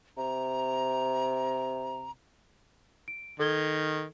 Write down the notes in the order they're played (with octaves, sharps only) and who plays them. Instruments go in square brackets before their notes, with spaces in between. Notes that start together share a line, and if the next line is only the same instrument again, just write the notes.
[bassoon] C3 [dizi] A#5
[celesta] D7
[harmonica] D#3 [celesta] A4 G#6 G7